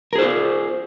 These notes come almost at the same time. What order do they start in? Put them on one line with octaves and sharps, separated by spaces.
A#4 G#4 C5 F4